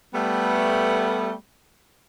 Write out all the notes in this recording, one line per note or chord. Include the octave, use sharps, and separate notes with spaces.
G3 A3 B3